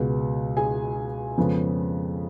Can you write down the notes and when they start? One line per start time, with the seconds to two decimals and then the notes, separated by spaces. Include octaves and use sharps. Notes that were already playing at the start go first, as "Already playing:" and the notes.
Already playing: C#2 B2 G#3 B3
0.57 G#4 G#5
1.38 F2 C#3 G#3 B3